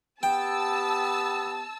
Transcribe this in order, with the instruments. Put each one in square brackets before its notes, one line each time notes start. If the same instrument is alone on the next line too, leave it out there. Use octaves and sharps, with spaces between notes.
[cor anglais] B3 [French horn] G4 [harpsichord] G5 [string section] A5 E6